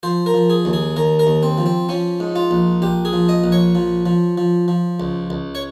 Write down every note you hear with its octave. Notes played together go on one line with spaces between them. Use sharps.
F3 C5
A#4
F3
G#4
D#2
G#4
D#2 A#4
A#4
D#2
C4
F3
C4
F3 C#4
G#2
F4
A#1
A#1 G4
G#4
F3
D#5
A#1
C#5
F3
F3
F3
F3
C#2
C#2
C#5